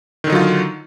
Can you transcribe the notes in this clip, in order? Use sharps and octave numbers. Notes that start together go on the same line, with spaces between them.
D3 D#3 F#3 D#4 F4